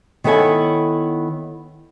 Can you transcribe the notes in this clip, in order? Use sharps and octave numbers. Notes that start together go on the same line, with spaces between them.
D#3 B3 E4 A4 C#5 G#5